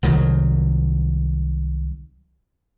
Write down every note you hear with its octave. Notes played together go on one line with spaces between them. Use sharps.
C2 D#3 F#3